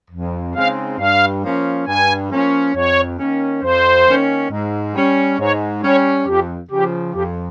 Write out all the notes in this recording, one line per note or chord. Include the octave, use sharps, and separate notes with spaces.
F2
C#3 G#3 C4 D#4 F5
G2 F5
F3 A#3 C#4
G2 G#5
F3 A#3 C#4
F2 C#5
D#3 A#3 C#4
F2 C5
D#3 A#3 C#4
G#2
G3 C#4
G#2 C#5
G3 C#4 C#5
F2 G4
C#3 F3 G4
F2 G4